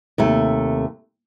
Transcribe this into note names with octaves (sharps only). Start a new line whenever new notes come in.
D#2 C3 A3